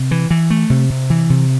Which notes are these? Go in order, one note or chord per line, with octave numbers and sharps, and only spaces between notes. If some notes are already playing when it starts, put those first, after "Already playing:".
Already playing: C3
E3
E3
A3
C3
C3
E3
C3